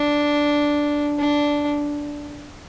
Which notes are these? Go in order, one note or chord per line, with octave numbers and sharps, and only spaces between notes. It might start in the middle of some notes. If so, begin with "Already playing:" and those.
Already playing: D4
D4